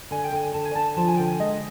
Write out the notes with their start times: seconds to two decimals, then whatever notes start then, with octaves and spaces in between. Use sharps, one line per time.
0.11 D3 G#5
0.24 G5
0.32 D3 G#5
0.54 D3 A5
0.65 G#5
0.75 D3 A5
0.96 F3 A5
1.08 G#5
1.17 D3 G5
1.28 G#5
1.39 G#3 D#5